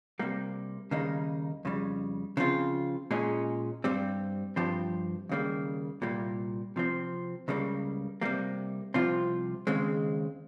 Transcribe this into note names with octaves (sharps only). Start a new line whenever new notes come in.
C3 G3 A#3
D#2 C#3 G3 A#3 D#4
F2 C#3 G3
C#3 F3 C4 F4
A#2 G#3 C#4 G#4
G2 G3 C4 G4
G2 F3 C4 G4
D#2 C#3 G3 A#3
C2 A#2 G3 A#3
C3 F3 C4
C#2 C#3 G3 A#3
C3 G3 A#3
C2 C3 F3 C4 F4
D#2 C#3 G#3 C4